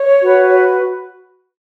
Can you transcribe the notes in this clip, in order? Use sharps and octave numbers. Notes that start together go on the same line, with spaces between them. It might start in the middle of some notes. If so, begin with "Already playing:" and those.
Already playing: C#5
F#4 B4